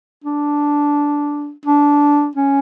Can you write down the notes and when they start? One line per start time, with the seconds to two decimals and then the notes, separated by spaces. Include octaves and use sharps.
0.24 D4
1.65 D4
2.35 C#4